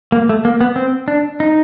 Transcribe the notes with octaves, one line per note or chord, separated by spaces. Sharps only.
A#3
A3
A#3
B3
C4
D4
D#4